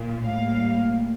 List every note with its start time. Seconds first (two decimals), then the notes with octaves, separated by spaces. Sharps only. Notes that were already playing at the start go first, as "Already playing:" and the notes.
Already playing: A#2
0.25 A2 G3 A#3 F5